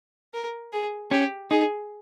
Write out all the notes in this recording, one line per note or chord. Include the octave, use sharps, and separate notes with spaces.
A#4
G#4
C#4 G4
D#4 G#4